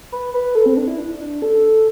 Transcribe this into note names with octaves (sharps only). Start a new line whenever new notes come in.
B4
B4
A4
C4
D4
E4
D4
D4
A4